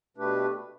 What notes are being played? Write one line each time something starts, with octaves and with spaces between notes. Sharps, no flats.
B2 A3 D4 G4 B4